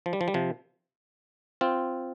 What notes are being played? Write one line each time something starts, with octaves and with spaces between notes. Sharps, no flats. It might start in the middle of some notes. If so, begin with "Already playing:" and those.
F3
G3
F3
G3
C3 F3
C4 F4